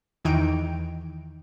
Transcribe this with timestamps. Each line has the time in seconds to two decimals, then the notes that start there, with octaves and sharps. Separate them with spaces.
0.24 E2 D#3 E3 D#4 G5 D7